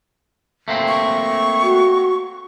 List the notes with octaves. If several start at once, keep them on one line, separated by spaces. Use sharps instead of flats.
A3 A#3 C4
C#6
F#4